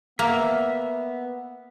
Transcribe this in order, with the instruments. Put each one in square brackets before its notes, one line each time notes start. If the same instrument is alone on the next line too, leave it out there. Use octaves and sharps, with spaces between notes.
[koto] A#3 [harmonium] B3 [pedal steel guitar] E5